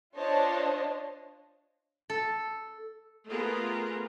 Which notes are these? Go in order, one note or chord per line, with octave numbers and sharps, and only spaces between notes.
D4 F4 C5 C#5 D#5 A5
A4
A3 B3 F4 G#4 A#4